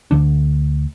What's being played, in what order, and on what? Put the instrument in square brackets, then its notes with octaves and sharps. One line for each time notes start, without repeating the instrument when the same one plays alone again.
[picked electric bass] D2 D3 D4